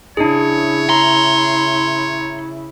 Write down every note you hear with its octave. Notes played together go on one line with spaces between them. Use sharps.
C#3 D4 E4 G#4 C#5
A#5 C6